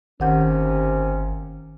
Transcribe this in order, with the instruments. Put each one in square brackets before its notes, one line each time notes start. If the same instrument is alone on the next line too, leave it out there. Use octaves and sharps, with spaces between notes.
[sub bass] G1 [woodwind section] D#2 C3 C#4 [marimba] D#3 F#5 G6